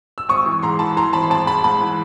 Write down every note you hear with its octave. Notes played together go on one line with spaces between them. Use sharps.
E6
G#1 C#6 D#6
E3
G#2 A#5 C6
E3 A5 B5
E3 A#5 C6
G#1 A5 B5
C6
G#1 A5 B5
G#2 A5 B5
G#2 A5 B5
E3